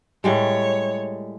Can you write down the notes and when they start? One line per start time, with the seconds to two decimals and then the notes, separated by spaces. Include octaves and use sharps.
0.24 A2 G3 G#3 C#5